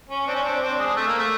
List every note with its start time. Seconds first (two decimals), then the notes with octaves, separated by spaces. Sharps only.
0.09 C#4
0.27 C4 D4
0.35 C#4
0.44 C4 D4
0.62 C4 D4
0.79 G#3
0.96 A3
1.07 A#3
1.18 A3